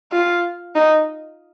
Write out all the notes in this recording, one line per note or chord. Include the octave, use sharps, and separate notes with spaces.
F4
D#4